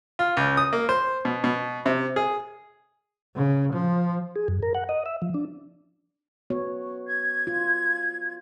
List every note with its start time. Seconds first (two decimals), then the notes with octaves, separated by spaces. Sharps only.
0.19 F4
0.37 C#2
0.57 D#6
0.73 A#3
0.89 C5
1.25 B2
1.44 B2
1.86 C3
2.16 G#4
3.36 C#3
3.73 F3
4.36 G#4
4.48 F#2
4.62 A#4
4.75 F#5
4.89 D#5
5.06 E5
5.22 F3
5.34 D4
6.50 B3 F#4 C#5
7.06 G#6
7.47 F4